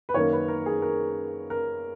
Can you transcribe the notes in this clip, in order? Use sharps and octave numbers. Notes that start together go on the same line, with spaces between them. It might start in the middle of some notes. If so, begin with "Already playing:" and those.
B4
F#2 D#3 A#3 C#5
B4
A#4
G#4
A#4
A#4